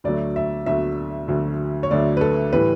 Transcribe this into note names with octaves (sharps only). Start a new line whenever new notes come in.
D2 D3 F#3 A3 D5
E5
D2 D3 F#3 A3 E5
D2 D3 F#3 A3
C#5
D2 D3 F#3 A3 D5
B4
A4
A2 E3 G3 B4